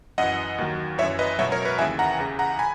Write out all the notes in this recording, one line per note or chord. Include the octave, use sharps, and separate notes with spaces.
F#2 E3 D#5 F#5
D#2 D#3 F#3
F#2 E3 C#5 E5
B4 D#5
C#2 B2 F#3 C#5 E5
A#4 C#5
B4
D#2 C#3 E3 E5 G#5
F#5 A#5
E2 C#3 E3
F#5 A#5
G#5 B5